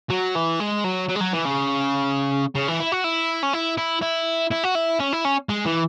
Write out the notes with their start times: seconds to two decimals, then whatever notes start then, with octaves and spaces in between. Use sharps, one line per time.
0.10 F#3
0.35 E3
0.60 G#3
0.84 F#3
1.08 F#3
1.15 G#3
1.20 F#3
1.33 E3
1.45 C#3
2.55 C#3
2.68 E3
2.80 E4
2.92 F#4
3.04 E4
3.43 C#4
3.53 E4
3.78 E4
4.02 E4
4.51 E4
4.64 F#4
4.75 E4
5.00 C#4
5.12 E4
5.25 C#4
5.49 G#3
5.66 E3